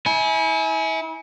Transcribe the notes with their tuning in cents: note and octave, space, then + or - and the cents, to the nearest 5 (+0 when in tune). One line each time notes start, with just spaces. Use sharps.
E4 -35 G#5 +20